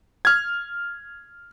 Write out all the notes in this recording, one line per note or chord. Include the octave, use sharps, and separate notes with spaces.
F6 G#6